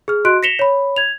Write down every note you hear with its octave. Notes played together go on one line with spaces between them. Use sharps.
G#4 F6
F#4 D#5 C6 F#6 D7
A#6 B6 C#7 E7 F7 G7
C#5 B5
G#6 F7